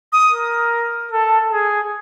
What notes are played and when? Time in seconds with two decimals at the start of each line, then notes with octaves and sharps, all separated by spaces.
0.13 D#6
0.32 A#4
1.11 A4
1.52 G#4